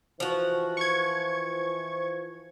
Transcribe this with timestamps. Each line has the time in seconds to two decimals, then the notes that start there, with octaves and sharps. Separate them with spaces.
0.20 E3 F3 F4 F#4 C5
0.77 C#6 G#6